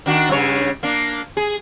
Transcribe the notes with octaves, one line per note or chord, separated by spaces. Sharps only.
D#3 D4 F#4
G2 C#3 C#5
A#3 D4
G#4